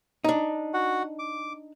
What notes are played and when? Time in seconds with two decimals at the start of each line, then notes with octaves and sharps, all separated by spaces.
0.24 D4 D#4
0.74 F#4 F#5
1.19 D6